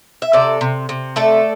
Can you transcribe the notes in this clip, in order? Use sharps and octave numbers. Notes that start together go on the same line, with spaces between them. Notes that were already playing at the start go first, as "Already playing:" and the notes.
E5
C3 A4 D5
C3
C3
A3 A4 D5